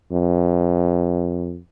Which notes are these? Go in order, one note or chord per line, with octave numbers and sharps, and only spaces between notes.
F2